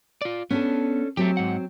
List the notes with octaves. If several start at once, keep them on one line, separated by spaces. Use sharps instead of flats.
F4 D5
B3 C#4 D4 A4
F#3 A3 C4 G4
G#2 F#5